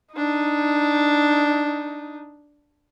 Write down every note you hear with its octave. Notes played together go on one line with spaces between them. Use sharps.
D4 D#4